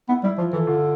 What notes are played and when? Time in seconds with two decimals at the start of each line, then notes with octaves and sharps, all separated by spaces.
0.08 B3 E4
0.23 G3 E4
0.38 F3 F4
0.53 E3 A4
0.67 D3 F4